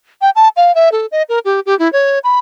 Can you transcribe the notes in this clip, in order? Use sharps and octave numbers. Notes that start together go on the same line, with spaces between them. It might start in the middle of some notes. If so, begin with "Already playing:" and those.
G5
A5
F5
E5
A4
D#5
A#4
G4
G4
E4
C#5
B5